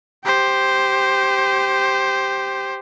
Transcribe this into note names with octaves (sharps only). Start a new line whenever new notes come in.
G4 C5